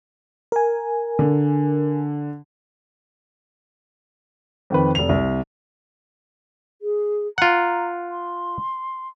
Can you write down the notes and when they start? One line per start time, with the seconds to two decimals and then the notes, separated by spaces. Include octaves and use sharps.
0.52 A#4 G#5
1.19 D3
4.70 F2 D#3 B4
4.95 F1 F7
5.09 C2
6.82 G#4
7.38 F4 F#5 A#5
8.10 C6